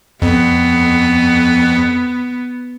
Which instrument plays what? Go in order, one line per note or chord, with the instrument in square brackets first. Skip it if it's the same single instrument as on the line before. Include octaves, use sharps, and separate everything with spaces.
[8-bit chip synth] F2 [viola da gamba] B3